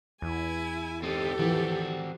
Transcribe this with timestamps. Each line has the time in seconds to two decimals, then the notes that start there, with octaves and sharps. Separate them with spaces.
0.22 E2 E4 G#5
1.03 C4 D#4 G4 A4
1.39 E3 F3 C4 F#4